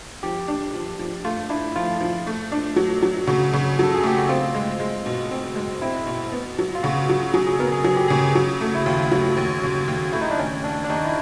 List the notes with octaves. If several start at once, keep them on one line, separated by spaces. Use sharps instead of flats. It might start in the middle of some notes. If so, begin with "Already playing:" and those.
F3 G4
D4
F3
F3
A3 F4
D4 E4
F3 F4
F3
A3
D4
F#3
F#3
C#3 F#4
C#3
F#3 A4
G#4
A3 G4
F#4
C4 F4
G#3
G#3
B2
C4
G#3
C4 E4
B2
B3
F#3
F4
C#3 F#4
F#3
F#3 G#4
G#4
B3 A#4
G#4
F#3 G#4
G4
C#3 G#4
F#3
A3
E4
D#2 F4
F#3
D#2
C#3
D#2
A3 E4
D#4
D4
D#2 C#4
D#2 D4
D4
D#2 D#4
E4